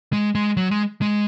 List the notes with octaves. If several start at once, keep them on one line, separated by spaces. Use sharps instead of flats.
G#3
G#3
F#3
G#3
G#3